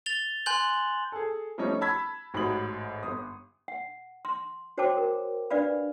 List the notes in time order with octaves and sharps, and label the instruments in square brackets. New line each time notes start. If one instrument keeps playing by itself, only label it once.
[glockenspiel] A6 F7 G7
G#5 C6 F#6 G6 F#7
[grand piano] G#4 A4
F3 G3 A3 C#4 D#4 C#5
A5 B5 E6 G#6 B6
A1 G#2 F#4 B5 D#6 F#7
G1 D#6
[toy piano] F#5
C6
F#4 C5 C#5 G5 A5 D6
A#4
D4 B4 D5 F5 B5